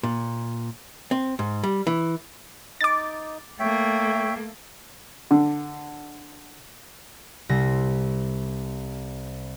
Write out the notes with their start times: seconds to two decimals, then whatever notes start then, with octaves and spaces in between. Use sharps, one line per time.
0.03 A#2
1.11 C4
1.39 G#2
1.63 G3
1.87 E3
2.81 D#4 D6 A6
3.60 A3 A#3 C#5 E5 G5
5.31 D3
7.49 C2 C3 A#6